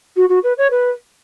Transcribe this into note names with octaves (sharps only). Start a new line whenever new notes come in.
F#4
F#4
B4
C#5
B4